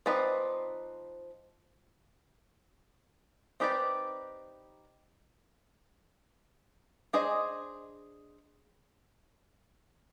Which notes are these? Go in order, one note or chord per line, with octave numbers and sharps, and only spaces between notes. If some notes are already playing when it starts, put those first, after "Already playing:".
F3 C4 D#4 B4 D5
C4 D#4 G4 B4 D5
D4 G#4 C5 D#5